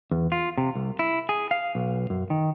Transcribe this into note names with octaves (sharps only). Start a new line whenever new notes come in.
E2
F4
C3
C2
E4
G#4
F5
B1
F#2
D#3